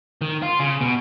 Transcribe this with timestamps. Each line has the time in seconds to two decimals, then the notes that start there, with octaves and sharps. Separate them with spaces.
0.21 D#3
0.42 F4
0.60 C#3
0.81 B2